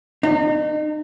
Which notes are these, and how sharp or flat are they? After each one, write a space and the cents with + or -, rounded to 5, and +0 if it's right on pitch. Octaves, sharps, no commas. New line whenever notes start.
D#4 -35